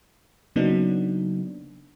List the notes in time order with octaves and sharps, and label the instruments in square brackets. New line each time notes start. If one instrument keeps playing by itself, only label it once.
[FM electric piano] C#3 F#3 A#3 B3 D4 D#4